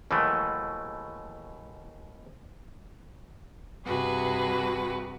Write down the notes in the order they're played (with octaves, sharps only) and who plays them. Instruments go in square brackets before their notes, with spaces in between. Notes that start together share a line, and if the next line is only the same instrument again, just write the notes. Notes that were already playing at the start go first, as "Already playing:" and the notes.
[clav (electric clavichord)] D#2 B2 E3 F#3 G#3 A3
[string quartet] G2 C3 F#4 G#4 B4